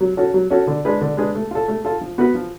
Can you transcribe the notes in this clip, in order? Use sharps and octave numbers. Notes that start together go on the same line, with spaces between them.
F#3
C#4 F#4 A4
F#3
C#4 F#4 A4
D3
G#3 D4 G#4 B4
D3
G#3 D4 G#4 B4
A3
F4 A4
A3
F4 A4
F3
B3 F#4 B4
F3